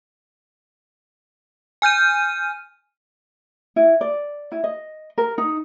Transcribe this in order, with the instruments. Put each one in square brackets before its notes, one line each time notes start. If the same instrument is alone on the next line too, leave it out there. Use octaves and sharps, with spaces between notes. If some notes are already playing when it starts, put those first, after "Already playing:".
[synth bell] G#5 F6 G6 D#7
[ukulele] E4
D5
E4
D#5
A#4
D#4